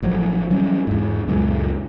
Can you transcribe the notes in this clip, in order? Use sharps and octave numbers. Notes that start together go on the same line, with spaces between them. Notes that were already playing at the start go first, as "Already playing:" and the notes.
A1 F3 F#3
E3 F#3 G3 C#4
E2 G#2
C#2 F#2 A#2 G#3